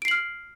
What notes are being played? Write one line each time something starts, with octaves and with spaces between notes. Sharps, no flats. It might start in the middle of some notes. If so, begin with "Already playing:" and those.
F6 C7 D7 F#7